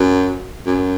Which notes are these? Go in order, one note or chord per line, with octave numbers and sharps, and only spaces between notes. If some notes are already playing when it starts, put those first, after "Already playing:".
Already playing: F#2
F#2